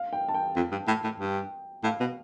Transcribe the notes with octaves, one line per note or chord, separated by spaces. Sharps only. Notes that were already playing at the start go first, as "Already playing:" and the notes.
Already playing: F5
G5
A5
G5
F2
G2
A2
A2
G2
A2 F5
B2